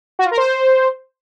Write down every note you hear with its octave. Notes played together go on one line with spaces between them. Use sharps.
F#4
F4
A#4
C5